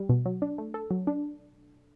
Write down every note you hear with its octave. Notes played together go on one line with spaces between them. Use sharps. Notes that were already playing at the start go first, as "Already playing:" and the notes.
Already playing: G3
B2
F#3
D4
A3
A4
F#3
D4